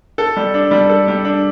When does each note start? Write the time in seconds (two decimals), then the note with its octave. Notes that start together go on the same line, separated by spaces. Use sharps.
0.18 A4
0.37 G3
0.54 D4
0.71 G3
0.89 A4
1.08 G3
1.25 D4